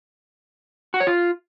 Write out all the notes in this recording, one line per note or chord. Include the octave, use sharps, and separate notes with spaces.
F#4
C#5
F4